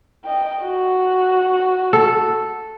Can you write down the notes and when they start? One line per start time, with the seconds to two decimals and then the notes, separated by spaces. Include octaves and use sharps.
0.25 D#5 G5
0.63 F#4
1.93 A4